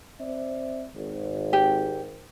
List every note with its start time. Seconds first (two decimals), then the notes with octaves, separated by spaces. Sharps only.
0.19 C4 D5 E5
0.94 G#1
1.53 G4